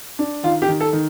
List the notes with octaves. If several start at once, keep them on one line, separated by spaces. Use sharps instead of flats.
D4
D#3 F4
G4
D#3
A4
D#3